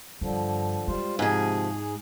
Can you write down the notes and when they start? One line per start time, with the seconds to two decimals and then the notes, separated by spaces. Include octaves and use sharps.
0.21 G2 D3 F3
0.88 G3 G#3 F4 C5
1.19 G#2 C3 F3 G#4